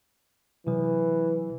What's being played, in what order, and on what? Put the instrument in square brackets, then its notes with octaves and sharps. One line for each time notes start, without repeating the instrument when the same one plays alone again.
[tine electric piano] C3 F#3 [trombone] E3